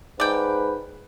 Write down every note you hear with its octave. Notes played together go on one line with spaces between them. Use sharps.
G#2 B4 D5 G5